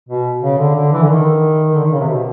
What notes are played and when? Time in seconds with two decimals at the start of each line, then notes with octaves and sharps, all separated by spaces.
0.09 B2
0.42 C#3
0.59 D3
0.75 D3
0.92 E3
1.03 D3
1.09 D#3
1.75 D3
1.84 D#3
1.92 C#3
2.00 C3
2.08 B2